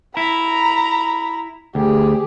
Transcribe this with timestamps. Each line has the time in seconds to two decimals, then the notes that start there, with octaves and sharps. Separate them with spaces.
0.17 E4 A#5 B5
1.75 D2 G4 G#4